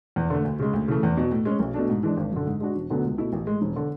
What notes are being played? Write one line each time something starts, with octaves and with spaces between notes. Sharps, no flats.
E2
D3 A3
D2
C#3 G#3
D2
C#3 E3 A3
E2
B2 F#3
A2
G#3 C#4
B1
B2 A3 D4
G#2
E3 G#3 D4
G#1
F#2 D3
G#2
G#3 D4 F#4
E1
D2 D3 F#3 B3
C#2
B2 A3 E4
A1
A2 G#3
E1
D3